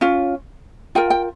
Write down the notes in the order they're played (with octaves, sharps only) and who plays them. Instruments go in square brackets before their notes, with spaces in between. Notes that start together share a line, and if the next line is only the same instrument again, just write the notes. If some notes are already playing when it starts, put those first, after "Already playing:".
[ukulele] C#4 F4
F4 A#4 G5
G5